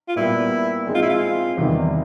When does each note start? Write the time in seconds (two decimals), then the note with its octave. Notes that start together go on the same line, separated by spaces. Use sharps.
0.08 F4
0.16 A#2 G3 B3 E4
0.87 G#3 C4 D#4 G#4
0.95 F4
1.02 E4
1.09 F4
1.57 E2 C3 D#3 G3